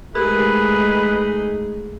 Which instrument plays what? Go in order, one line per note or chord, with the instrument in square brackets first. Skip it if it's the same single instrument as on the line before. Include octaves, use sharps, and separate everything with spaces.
[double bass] G#3 A3 [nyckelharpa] D#4 G#4 [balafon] G4 A#4 [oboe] B4